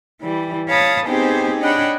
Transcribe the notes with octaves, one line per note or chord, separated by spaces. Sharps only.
E3 G3
C#5 F5 A5 B5 D#6
B3 C4 D#4 G4 G#4 C5
D4 C#5 D#5 F#5 G5 B5